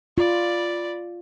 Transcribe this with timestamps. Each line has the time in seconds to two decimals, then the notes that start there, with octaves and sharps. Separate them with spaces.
0.18 F4 D5 B5